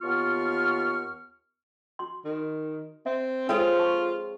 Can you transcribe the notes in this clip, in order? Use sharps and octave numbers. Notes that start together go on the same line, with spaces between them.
D#2 B3 F4 C#6 F6
F#4 C6
D#3
C4 E5
G#3 C4 F4 A4 C#5 G5
G#4 A5 C#6